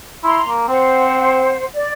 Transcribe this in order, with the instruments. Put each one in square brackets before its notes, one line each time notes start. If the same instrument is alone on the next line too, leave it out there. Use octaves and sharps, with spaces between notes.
[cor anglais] E4 [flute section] A#5 C6
[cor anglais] A#3
[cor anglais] C4 [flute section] C5 F#5
[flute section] D5